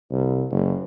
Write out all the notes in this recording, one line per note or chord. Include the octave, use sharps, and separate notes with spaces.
C2
F#1